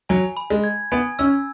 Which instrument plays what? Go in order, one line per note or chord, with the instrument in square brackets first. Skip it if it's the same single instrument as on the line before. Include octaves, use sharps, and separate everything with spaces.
[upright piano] F#3 [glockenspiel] G#5
[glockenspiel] B5
[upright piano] G#3
[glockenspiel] G#6
[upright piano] B3 [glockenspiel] G#5
[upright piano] C#4 [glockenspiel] E6